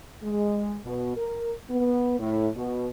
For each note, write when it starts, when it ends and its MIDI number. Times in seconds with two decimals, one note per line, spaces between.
0.23 0.78 56
0.86 1.16 47
1.17 1.51 70
1.69 2.14 59
2.19 2.48 45
2.56 2.87 47